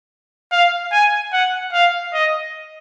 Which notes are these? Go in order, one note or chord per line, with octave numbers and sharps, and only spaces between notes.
F5
G#5
F#5
F5
D#5